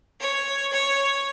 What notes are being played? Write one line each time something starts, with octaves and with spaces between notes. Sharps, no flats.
C#5
C#5